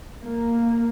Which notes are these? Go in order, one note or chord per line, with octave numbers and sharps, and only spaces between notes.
A#3